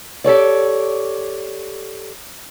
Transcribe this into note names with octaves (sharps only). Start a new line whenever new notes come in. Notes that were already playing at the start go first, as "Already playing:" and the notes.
G4 A4 C#5 D5